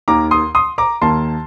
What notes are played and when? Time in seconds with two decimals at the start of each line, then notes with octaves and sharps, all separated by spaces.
0.08 D#2 D#3 A#3 A#5 D6
0.31 C6 D#6
0.55 C6 D#6
0.78 A#5 D6
1.01 D#2 D#3 A#3 A5 C6